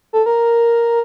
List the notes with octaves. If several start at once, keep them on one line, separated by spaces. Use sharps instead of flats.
A4
A#4